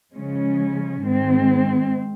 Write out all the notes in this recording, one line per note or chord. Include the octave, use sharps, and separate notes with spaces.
C#3 F3 G#3 C#4
G#2 D#3 G#3 C4